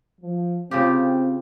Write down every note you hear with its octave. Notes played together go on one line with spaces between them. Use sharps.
F3
C#3 C4 F4 G4